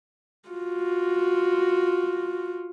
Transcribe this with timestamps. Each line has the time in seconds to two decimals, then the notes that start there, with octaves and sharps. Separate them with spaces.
0.50 F4 F#4